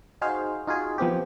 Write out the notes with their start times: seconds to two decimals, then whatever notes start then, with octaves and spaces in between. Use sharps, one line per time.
0.22 D#4 F#4 G#4 C5 F5
0.67 D#4 F4 F#4 G#4
0.98 F3 B3 C4 G4